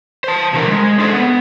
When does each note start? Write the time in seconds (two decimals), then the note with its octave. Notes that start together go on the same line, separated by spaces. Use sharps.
0.24 C5 A5
0.53 B2 D3 E3 A4 A#4
0.67 G3 G#3
0.99 D4 G#4 A4 C5
1.14 B3